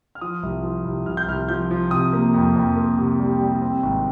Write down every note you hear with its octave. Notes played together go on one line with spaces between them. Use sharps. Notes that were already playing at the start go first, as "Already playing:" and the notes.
F6
F3 D#6
C2
F3
C2
C2 F6
G6
C2 F6
F3 G6
F3
C3 D#6
A#3
F2
F2
A#3
C3
G3
G3
C4
G#1